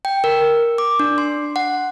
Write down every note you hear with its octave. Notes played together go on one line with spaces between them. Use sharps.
G5
A#4
D6
D4
C6
F#5